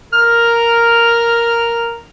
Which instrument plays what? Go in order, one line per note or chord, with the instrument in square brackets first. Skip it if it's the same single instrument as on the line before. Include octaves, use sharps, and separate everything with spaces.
[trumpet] A#4 [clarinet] F6